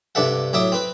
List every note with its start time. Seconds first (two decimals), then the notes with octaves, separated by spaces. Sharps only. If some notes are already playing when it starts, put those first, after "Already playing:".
0.15 G2 C3 D4 A4 E5 F#5
0.53 A2 F#3 E5 D6 D#6
0.72 C4 B4